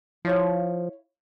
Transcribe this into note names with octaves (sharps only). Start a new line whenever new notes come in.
F3 E4 C#5 F5